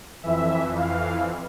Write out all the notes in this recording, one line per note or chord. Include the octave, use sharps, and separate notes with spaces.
F2 E3 E5
F5